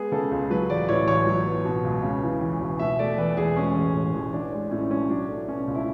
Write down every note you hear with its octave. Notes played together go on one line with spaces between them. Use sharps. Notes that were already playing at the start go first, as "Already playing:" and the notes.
Already playing: G#3 B3 G#4
C#3 A4
C#2
F#3 B4
A1 D5
A2 C#5
A1 C#5
F#3
B3
B2
C#2
C#3
E3
E2
E1
B2 E5
A3 D5
E2 B4
E1 G#4
G#3 C#4
A1
A2
A1
E3 D4
G#3
A2 C#4
B1 C#4
F#3 D4
A3
B2 C#4
C#2
E4